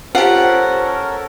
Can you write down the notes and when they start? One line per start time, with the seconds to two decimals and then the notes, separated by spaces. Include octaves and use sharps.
0.15 C#4 F4 G4 A4 A#4 C5 F#5